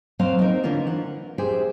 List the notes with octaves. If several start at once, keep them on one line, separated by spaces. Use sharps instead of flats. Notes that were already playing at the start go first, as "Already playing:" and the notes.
F#3 A#3 C4 C5 F5
C4 D#4 A#4
D3 E3 C#4 F4 A#4
F#5
G4 G#4 C5 E5 G5